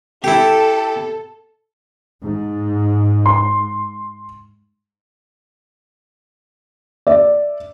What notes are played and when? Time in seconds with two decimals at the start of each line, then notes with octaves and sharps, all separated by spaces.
0.24 E4 G4 A4
2.22 G#2
3.26 C6
7.07 D5 E5